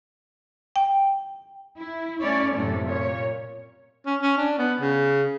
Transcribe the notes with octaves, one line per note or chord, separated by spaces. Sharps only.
G5
E4
A3 C#4 E4 C#5 D5
F#2 A2 C3 A3 A4
A#2 C#5
C#4
C#4
D4
B3
C#3